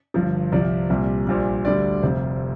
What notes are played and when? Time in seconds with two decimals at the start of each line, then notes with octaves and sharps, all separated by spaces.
0.14 G1 G2 F3
0.52 C2 C3 F3 D5
0.90 C2 A#2 G3
1.27 A#1 A#2 G3
1.65 D2 D3 G3 D5
2.02 F1 F2 C3 F3 C5